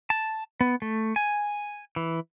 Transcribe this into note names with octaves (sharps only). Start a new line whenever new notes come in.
A5
B3
A3
G#5
E3